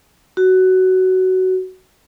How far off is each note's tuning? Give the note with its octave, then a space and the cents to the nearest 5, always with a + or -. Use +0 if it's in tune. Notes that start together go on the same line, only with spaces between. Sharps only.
F#4 +15